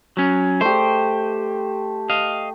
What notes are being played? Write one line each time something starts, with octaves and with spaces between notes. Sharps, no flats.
F#3 C#4
A3 G4 C5
D#5 F5